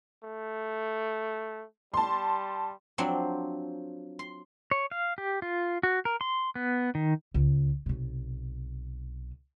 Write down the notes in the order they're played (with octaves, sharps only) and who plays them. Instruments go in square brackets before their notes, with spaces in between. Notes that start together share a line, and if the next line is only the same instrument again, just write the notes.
[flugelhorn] A3
[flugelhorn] G3 [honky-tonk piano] A5 C6
[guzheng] F3 F#3 C4 D4
C6
[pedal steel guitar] C#5
F5
G4
F4
F#4
A#4
C6
B3
D#3
[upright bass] C#2
B1 C3